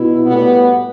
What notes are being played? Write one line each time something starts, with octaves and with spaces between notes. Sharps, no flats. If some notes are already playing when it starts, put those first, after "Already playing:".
Already playing: B2 E4
A2 G3 B3